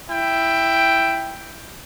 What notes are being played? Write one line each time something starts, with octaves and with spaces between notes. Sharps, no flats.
E4 G5